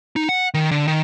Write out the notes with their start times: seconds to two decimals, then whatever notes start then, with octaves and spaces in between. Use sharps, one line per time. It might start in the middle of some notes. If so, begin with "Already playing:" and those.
0.16 D#4
0.29 F#5
0.54 D#3
0.71 D3
0.88 D#3